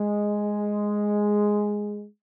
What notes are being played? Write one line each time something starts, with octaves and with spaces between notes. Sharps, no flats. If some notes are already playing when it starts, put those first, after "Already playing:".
Already playing: G#3